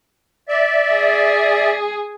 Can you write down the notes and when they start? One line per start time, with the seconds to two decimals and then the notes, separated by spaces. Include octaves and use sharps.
0.48 D5 E5
0.93 G#4